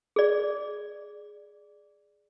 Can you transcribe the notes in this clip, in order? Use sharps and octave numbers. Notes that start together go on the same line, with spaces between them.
G#4 D5